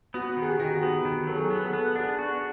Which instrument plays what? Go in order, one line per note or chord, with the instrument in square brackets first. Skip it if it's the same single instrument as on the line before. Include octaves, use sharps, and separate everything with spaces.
[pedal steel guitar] B3 [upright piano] F#4
[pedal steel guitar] D#3
[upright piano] G#4
G4
[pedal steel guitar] D#3 [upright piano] F#4
[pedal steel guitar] B3
D#3
[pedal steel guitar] F#3 [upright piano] A4
[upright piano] G#4
[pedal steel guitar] B3
[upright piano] A4
[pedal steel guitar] B3
[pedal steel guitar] D4 [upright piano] G#4
[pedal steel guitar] F#4